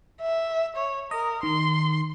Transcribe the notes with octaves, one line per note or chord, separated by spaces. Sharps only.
E5
C#5
A#4 D#5
D#3 C6